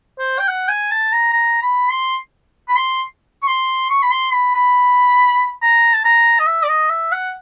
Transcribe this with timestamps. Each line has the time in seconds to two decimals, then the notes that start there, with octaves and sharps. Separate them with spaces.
0.19 C5
0.39 G5
0.48 F#5
0.69 G#5
0.91 A5
1.13 A#5
1.33 A#5
1.62 B5
1.90 C6
2.68 B5
2.76 C6
3.43 C#6
3.48 C6
3.90 C#6
4.03 B5
4.12 C6
4.34 B5
4.55 B5
5.62 A#5
5.94 A5
6.05 A#5
6.40 D#5
6.47 E5
6.63 D5
6.69 D#5
6.90 E5
7.12 F#5